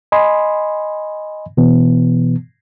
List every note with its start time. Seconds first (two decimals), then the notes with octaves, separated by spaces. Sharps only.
0.12 D#5 G#5 B5 C6
1.57 B2 E3 B3